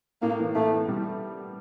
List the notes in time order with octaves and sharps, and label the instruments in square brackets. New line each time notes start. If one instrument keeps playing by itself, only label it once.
[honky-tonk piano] A2 [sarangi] A#3
[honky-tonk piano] E3
[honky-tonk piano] A2 [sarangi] A3
[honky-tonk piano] B3
G3